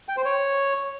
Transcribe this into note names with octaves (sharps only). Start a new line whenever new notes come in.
G5
C5
C#5